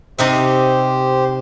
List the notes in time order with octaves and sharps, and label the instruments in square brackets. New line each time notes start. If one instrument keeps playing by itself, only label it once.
[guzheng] C3 D#4 E5 [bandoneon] G4 C5